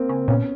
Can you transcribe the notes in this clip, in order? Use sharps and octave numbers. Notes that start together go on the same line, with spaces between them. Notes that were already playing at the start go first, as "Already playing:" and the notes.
Already playing: A#3 C4
C#3
A#2 B3 C#4